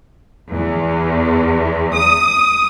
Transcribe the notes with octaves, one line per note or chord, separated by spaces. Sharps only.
E2
D#6